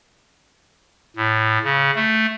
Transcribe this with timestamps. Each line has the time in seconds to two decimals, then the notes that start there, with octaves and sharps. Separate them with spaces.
1.16 A2
1.64 C#3
1.95 A3